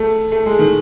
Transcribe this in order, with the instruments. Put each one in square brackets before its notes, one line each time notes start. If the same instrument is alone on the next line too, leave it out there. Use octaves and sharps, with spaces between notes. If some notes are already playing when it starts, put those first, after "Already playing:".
Already playing: [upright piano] A3
A3
G#3
D#3